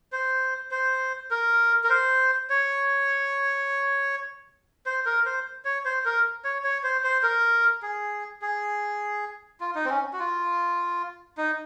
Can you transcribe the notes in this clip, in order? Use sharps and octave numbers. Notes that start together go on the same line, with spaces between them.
C5
C5
A#4
A#4
C5
C#5
C5
A#4
C5
C#5
C5
A#4
C#5
C#5
C5
C5
A#4
G#4
G#4
F4
D#4
C4
C#4
F#4
F4
D#4